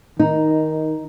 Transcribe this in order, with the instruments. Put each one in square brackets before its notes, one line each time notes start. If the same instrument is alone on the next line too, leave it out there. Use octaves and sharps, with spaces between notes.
[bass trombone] D#3 [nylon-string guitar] D#4